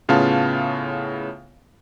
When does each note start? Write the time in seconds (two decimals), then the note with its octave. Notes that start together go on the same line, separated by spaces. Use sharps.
0.09 A2 C#3 B3 F4 F5 A5